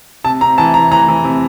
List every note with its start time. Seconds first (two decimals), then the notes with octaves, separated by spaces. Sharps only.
0.24 C3 A5
0.41 C3 A#5
0.58 E3 A5
0.74 E3 A#5
0.91 E3 A#5
1.08 E3
1.24 C3